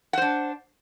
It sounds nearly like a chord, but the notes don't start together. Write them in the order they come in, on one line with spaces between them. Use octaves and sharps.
F#5 C5 D4